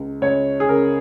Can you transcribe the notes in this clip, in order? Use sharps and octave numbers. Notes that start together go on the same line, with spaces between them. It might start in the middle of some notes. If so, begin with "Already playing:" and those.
Already playing: C#2
C#2 C#5
G#4
C#3 A#4